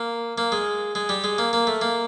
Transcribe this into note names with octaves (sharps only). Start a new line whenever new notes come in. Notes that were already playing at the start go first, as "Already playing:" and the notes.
Already playing: A#3
A#3
G#3
G#3
G3
G#3
A#3
A#3
A3
A#3